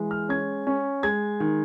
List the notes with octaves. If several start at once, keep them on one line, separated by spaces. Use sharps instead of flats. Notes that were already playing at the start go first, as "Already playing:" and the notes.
Already playing: E3 G#3
F6
C#4 G#6
C#4
G#3 G#6
D#3